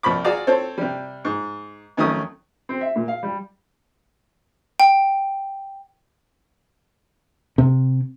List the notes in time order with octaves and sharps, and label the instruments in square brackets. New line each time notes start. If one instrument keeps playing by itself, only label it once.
[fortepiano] C2 F3 B5 D6
F4 F#4 G#4 D5 A#5 D6
C4 A4 C5 C#5
C3 G3
G#2
F2 D#3 F#3 A3 C#4 D#6
C4
E5
A#2
F5
G3
[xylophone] G5
[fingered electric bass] C3